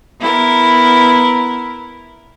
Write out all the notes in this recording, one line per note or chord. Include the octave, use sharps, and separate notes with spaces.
B3 E4 A#4